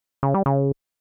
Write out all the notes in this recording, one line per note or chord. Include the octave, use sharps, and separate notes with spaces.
C#3
G3
C#3